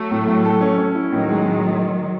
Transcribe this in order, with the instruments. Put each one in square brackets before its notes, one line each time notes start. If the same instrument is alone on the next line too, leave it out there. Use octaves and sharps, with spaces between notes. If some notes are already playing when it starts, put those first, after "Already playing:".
Already playing: [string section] F#3 A3
[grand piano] A2
A2
A4
C#4
C#4
E4
[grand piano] A2 [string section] D#3 F#3
[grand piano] G#3
A2